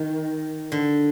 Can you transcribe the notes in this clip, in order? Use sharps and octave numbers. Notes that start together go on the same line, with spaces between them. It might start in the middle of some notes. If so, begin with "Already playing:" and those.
Already playing: D#3
D3